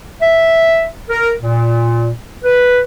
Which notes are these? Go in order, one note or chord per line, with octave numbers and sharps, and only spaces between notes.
E5
A#4
A#2
B4